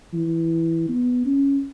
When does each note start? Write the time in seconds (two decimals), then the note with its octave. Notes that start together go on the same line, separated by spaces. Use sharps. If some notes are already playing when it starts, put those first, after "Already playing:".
0.14 E3
0.89 B3
1.26 C#4